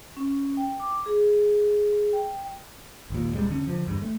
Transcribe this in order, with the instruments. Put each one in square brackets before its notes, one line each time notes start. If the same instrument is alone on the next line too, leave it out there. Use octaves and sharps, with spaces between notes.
[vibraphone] C#4
G5
D6
G#4
G5
[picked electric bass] G#1 D#2 A#2
D#1 G3 G#3
E2 D3 C#4
D3 F3
G1 E2 G2
A3